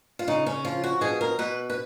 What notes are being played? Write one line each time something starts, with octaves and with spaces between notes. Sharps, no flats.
F4
C#3 D#4
C#4
F3 F4
F#4
B2 G#4
A#4
B2 B4
B4